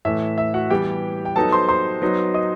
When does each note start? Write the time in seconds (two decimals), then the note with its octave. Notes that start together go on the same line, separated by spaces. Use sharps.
0.05 A2 E3 A3 E5
0.38 E5
0.54 F#4 F#5
0.70 E3 G3 B3 E4 G4 G5
1.25 G5
1.36 F#3 B3 D#4 A4 A5
1.52 C5 C6
1.69 C5 C6
2.02 F#3 B3 D#4
2.34 D#5 D#6